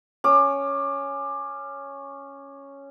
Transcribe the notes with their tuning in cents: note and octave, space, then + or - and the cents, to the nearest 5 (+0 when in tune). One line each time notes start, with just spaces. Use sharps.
C#4 +0 D6 +20